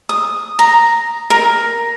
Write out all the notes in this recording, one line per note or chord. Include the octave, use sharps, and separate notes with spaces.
D#6
A#5
A#4